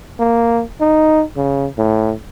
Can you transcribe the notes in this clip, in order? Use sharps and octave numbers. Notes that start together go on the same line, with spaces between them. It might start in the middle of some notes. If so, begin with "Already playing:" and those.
A#3
D#4
C#3
A2